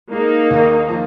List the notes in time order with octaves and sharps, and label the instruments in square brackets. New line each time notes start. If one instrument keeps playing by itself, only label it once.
[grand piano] G#3 [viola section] A#3 D#4
[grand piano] D#2
F3